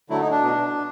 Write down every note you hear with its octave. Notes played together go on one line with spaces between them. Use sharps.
D3 F#3 A3 E4
D#4
D4
B2